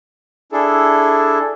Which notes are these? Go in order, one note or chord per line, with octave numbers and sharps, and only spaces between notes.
D4 E4 G#4 A4